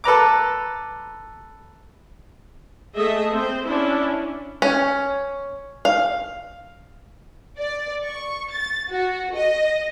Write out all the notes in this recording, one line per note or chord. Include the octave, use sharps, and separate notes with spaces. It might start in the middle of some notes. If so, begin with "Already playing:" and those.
A4 B4 A#5 D6
A3 G#4 A4 D#5 E5
C4 C5
C#4 D4 E4
C#4
F5
D5
C#6
A6
F#4
D#5